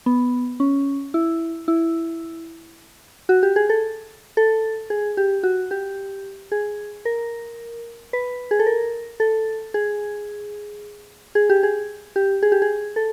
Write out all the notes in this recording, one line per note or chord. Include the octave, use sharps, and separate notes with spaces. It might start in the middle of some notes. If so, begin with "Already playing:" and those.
B3
C#4
E4
E4
F#4
G4
G#4
A4
A4
G#4
G4
F#4
G4
G#4
A#4
B4
G#4
A4
A#4
A4
G#4
G#4
G4
G#4
G4
G#4
G4
G#4
A4